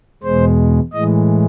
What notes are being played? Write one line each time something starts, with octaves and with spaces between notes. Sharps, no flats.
E2 B2 G#3 C5
A2 E3 G#3 D#5